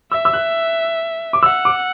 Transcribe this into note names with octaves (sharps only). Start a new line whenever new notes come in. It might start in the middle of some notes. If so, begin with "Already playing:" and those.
E5 E6
E6
F#6
D6
F#5 E6
D6